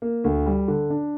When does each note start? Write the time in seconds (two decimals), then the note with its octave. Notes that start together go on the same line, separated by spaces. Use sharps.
0.02 A#3
0.24 D2
0.46 G3
0.68 D3
0.90 D4